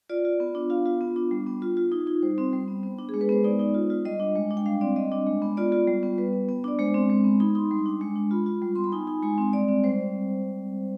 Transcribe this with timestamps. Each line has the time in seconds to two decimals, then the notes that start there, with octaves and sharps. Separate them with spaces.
0.09 F4 D5
0.25 F4
0.40 B3
0.55 D4
0.70 F4 F5
0.86 F4
1.01 B3
1.16 D4
1.31 G3
1.47 B3
1.62 F4
1.77 F4
1.92 D#4
2.07 D#4
2.22 G3 C5
2.38 C4
2.53 G3
2.68 B3
2.83 B3
2.99 D4
3.09 G#3 G#4
3.21 B4
3.29 B3 C5
3.44 D#4 D5
3.59 D#4
3.74 F4
3.90 F4
4.05 G3 D#5
4.20 D4
4.35 G#3
4.51 D4
4.57 G5
4.66 G3 F5
4.81 C4 D5
4.96 G3 D#5
5.12 D4
5.27 G#3
5.42 B3
5.57 F4 D5
5.72 F4
5.88 G3
6.03 B3
6.18 G3 B4
6.33 B3
6.49 B3
6.64 D4 D5
6.79 G#3 C5
6.94 C4
7.09 G#3
7.24 B3
7.40 D#4 B5
7.55 D#4 C6
7.71 G3
7.86 D4
8.01 G#3
8.16 D4
8.31 F4 B5
8.46 F4
8.62 G3
8.75 B3 C6
8.84 B5
8.92 D#4 G#5
9.07 D#4
9.23 G#3 G#5
9.38 C4
9.53 G3 D5
9.68 C4
9.84 G3 C5